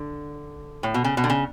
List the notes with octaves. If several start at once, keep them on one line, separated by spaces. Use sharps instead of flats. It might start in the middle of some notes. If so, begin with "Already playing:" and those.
Already playing: D3
A2
B2
C#3
B2
D3
C#3